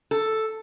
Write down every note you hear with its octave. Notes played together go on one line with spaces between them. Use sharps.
A4